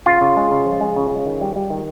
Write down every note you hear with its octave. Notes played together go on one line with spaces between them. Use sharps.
C#3 F4
C#3
G#3
C#3
F3
G#3
C#3
C#3
D#3
G3
G3
D#3